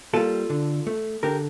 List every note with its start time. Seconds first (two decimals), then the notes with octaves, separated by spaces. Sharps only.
0.14 G3 A#3 F4 A4
0.50 D3
0.87 A3
1.23 D3 G4 A#4